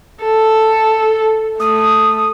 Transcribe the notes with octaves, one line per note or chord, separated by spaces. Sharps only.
A4
A3 D#6